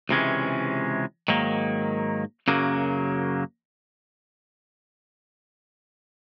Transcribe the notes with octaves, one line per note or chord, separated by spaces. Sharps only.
C#2 C3 E3 G#3 C#4
G#2 D#3 F#3 A#3
F#2 C#3 F#3 A#3